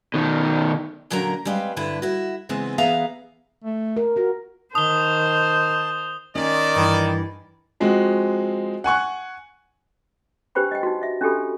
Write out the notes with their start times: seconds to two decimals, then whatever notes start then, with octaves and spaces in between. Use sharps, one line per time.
0.14 B2 D#3
1.10 A#2 D3 F#3 C#4 A#4 A#5
1.45 G3 G#3 C4 B4 F5
1.76 G2 D3 E4 B4
2.02 E4 F#4
2.49 C#3 E3 G#3 B3 C4
2.78 E3 B3 G#4 E5 F5 A#5
3.64 A3
3.96 A#4
4.16 F4 F#4 A#4
4.75 D#3 C5 A5 D#6 G7
6.35 D#3 C#4 D5
6.76 G2 E3
7.80 F3 G#3 C4 F#4
8.84 F#5 G#5 C#6 F#6
10.55 D4 G4 B4 C5 G5 B5
10.71 D#5 G5
10.83 D#4 F#4
11.02 D#5 E5
11.21 C#4 D4 F#4 G4 A4 B5